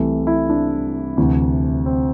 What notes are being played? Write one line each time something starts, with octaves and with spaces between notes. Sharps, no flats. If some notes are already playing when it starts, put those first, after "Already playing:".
Already playing: C2 C3 E3 A3
E4
D4
D2 C3 E3
C4